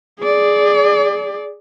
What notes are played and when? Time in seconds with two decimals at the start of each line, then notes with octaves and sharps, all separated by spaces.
0.20 G#4 D5